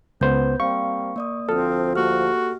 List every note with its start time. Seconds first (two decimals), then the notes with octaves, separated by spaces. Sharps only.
0.21 C#2 B3 C5 G6
0.60 G3 A#3 C4 F5 C#6
1.16 A#3 D5 D#6
1.49 D2 F3 C4 A4 D#6 F6
1.96 A#3 F#4 G4 F6